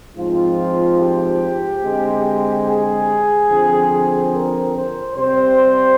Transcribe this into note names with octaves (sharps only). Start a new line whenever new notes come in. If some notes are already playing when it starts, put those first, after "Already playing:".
G#2 F3 C4 F4
G4
D3 G#3 C4
G#4
D3 F3 C4
A#4
C5
C3 G3 C4 C5